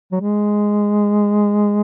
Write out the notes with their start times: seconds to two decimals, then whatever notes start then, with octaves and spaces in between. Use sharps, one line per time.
0.12 F#3
0.20 G#3